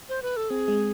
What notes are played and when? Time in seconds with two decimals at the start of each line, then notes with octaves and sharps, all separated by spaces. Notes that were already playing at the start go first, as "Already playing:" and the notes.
0.09 C5
0.22 B4
0.37 A4
0.50 C4 G#4
0.68 G#3